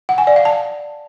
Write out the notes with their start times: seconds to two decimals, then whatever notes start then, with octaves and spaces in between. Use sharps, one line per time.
0.09 F#5
0.18 G#5
0.27 D5
0.36 F5
0.45 A5